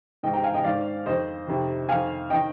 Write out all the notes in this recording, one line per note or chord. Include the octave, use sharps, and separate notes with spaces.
G#2 D#3 D#5 G5
G5 A#5
F5 G#5
D#5 G5
G#2 D#3 D5 F5
F2 D#3 C5 D#5
F2 C3 D#3
F2 D#3 F5 G#5
D#3 D#5 G5